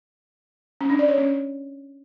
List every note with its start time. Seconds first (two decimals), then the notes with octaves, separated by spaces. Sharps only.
0.81 C#4
0.90 D4
0.99 D5
1.08 C#5
1.18 C#4